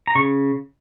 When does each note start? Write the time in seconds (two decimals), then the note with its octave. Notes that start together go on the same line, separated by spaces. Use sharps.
0.07 A#5
0.15 C#3 C#6